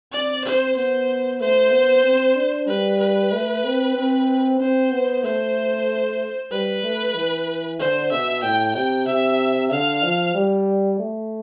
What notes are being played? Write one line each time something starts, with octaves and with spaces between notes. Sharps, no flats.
C4 D5
C5
B3 C5
A3 C5
B3
C4
D4
G3 B4
B4
A3
C4
C4
C4 C5
B3
A3 C5
G3 B4
A3
E3
D3 C5
B2 E5
A2 G5
C3 G5
C3 E5
D3 F5
F3
G3
A3